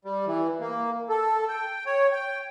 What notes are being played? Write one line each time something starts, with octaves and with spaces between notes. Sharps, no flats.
G3
E3
A#3
A4
G5
C#5
G5